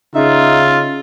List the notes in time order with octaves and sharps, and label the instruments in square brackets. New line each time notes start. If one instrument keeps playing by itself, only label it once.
[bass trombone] C#3 [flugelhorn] D#4 [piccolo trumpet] F4 [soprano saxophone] E5